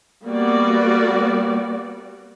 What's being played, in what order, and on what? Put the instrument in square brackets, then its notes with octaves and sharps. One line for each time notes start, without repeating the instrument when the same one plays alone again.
[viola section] G3 A#3 B3 F#4 D5